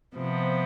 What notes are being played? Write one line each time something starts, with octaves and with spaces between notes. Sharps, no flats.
C3 F3 B3